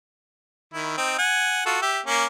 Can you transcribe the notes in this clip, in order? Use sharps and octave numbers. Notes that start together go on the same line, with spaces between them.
D#3 E4
C4 D#4
F#5 G#5
F4 F#4 A4
G4 E5
A#3 C#4